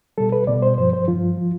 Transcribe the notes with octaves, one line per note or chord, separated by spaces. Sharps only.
B2 G3 A4
B4
B2 G3 D5
C5
G2 F3 C5
C5
G2 F3 F4
F3